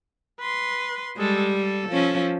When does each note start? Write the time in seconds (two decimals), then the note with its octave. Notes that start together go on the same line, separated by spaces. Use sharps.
0.40 B4 C6
1.17 G3 G#3 A4
1.54 A4
1.89 F3 C#4